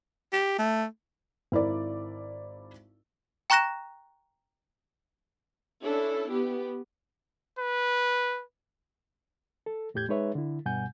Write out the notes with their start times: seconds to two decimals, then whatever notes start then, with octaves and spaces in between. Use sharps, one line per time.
0.33 G4
0.58 A3
1.52 G#1 E4 A#4 D5
3.50 G5 A#5 C#6 F#6 A#6 E7
5.83 C#4 D4 E4 A4
6.29 B3 G4
7.59 B4
9.66 A4
9.94 E2 A2 G4 G6 G#6
10.09 G#3 D#4 G#4 B4 C#5 E5
10.35 D3 E4
10.66 G2 B2 G3 F#5 G#5 G6